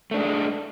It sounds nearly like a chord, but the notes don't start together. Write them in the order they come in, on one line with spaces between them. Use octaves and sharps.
A3 D4 G#3